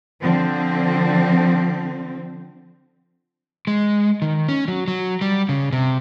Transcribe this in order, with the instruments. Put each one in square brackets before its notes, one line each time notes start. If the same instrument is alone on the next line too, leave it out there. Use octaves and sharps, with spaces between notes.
[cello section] D3 F3 C4
[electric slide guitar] G#3
D#3
C#4
F#3
F#3
G3
C#3
C3